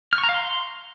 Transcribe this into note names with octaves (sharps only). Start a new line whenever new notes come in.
F6
C#6
A#5
F5
C6